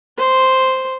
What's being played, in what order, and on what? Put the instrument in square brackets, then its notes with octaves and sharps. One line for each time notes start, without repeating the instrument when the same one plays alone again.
[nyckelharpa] C5